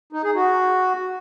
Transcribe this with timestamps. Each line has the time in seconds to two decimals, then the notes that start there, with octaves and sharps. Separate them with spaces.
0.13 D#4
0.24 G#4
0.35 F#4